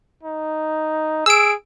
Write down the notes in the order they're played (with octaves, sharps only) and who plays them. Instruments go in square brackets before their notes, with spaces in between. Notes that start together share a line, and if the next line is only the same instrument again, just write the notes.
[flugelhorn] D#4
[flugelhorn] G#4 [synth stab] E6 D7